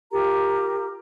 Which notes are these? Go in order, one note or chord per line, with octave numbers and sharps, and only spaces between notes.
F4 G4 A#4 A#5